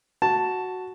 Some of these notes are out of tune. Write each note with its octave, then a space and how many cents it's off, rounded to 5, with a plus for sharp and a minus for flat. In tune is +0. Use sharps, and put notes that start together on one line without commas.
F#4 +0 A5 +0